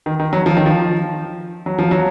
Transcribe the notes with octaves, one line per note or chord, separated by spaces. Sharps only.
D#3
D#3
F#3
F3
D#3
F3
F#3
F3
F#3